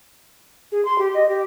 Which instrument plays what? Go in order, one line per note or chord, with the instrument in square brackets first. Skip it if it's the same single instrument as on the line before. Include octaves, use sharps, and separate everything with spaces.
[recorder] G#4
C6
G4
D#5
G4